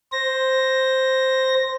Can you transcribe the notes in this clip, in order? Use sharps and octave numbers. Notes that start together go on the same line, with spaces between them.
C5 A#6